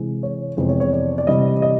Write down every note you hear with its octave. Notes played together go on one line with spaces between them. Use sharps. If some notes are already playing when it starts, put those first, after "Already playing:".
Already playing: C3 E3 G#3
C#5
F2 C3 E3 G#3 B3 C5
C#5
C#5
D5
D5
C3 E3 G3 D#5
D#5